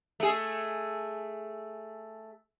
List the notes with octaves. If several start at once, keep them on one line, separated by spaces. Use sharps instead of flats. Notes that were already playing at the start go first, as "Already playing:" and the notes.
A3 G#4